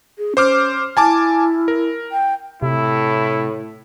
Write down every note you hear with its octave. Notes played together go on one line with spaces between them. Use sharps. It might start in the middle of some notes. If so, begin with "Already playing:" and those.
G#4
C#4 C5 D6 F6
E4 G#5 A5 D6
A#4
G5
A2 C3 E4